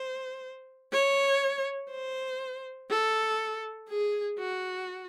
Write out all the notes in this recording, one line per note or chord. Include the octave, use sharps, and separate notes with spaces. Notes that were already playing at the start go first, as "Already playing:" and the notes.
Already playing: C5
C#5
C5
A4
G#4
F#4